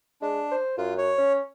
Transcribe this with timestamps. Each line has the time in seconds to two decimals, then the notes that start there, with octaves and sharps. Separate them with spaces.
0.22 G#3 D4
0.51 C5
0.78 F#2 F4
0.98 C#5
1.18 C#4